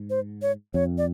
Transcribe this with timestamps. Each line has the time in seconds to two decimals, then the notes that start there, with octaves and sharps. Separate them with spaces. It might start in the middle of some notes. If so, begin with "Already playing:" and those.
Already playing: G#2
0.10 C5
0.42 C#5
0.74 F2 C#5
0.98 D5